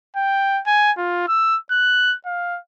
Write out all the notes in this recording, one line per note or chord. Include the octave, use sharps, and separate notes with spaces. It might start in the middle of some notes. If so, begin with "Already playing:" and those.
G5
G#5
F4
E6
F#6
F5